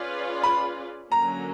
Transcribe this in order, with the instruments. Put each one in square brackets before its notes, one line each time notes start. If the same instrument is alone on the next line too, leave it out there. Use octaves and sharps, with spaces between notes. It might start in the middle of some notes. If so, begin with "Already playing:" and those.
Already playing: [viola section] C#4 F4 G#4 B4 D5
[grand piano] B5
[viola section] D3 F#3 A#3 C#4 [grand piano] A#5